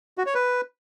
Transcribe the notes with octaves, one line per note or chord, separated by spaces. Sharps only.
F#4
C#5
B4